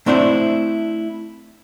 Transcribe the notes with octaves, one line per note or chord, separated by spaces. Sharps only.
A3 C4 D4 E4 C5